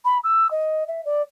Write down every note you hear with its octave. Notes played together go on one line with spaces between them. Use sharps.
B5
E6
D#5
E5
D5